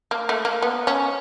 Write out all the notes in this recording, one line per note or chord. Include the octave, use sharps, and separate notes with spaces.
A#3
A3
A#3
B3
C#4